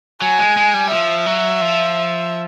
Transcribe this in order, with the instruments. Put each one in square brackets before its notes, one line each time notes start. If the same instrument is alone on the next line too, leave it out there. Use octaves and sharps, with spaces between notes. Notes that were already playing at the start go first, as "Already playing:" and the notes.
[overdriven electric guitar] F#3 [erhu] G#5
[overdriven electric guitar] G#3
G#3
G3
[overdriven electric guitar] F3 [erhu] E5
[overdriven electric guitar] F#3
F3